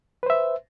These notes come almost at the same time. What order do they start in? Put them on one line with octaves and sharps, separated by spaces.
B4 C5 E5